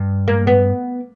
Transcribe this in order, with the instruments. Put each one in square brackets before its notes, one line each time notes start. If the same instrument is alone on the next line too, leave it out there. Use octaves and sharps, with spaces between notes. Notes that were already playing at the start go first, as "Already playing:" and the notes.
Already playing: [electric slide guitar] G2
[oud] A#3
B3